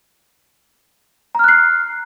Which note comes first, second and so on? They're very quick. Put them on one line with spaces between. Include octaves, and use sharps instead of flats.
A#5 F6 F#6 C7